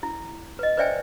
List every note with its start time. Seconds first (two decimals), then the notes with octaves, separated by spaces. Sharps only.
0.03 E4
0.59 B4 D#5
0.77 B4 C5 D5 E5 G5 G#5